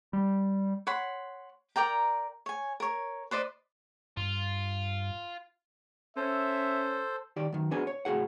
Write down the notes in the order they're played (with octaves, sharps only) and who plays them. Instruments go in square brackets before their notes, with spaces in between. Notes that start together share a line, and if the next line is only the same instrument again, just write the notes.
[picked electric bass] G3
[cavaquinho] C#5 F#5 B5 C6
A#4 D5 G5 A#5
C#5 G#5
A#4 C#5
B4 C5 D5 D#5
[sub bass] G2 [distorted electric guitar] F4
[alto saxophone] C#4 [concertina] A4 C5 [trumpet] E5
[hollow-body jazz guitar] D#3 G4 D5
F#2 D#3
B3 D4 F#4 G#4 G#5
C#5
C#2 A2 F#4 G#4 F#5